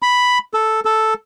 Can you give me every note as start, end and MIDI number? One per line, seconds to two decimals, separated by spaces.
0.02 0.38 83
0.54 0.80 69
0.85 1.14 69